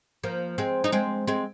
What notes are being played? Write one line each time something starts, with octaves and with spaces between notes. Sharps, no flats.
F3 A#3
G#3 C4
D#4
G#3 C4
G#3 C4